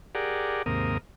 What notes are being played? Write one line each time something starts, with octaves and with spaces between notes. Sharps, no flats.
G4 G#4 A#4 D5 F#5
D#2 G#2 C3 A#3 A#4 D#6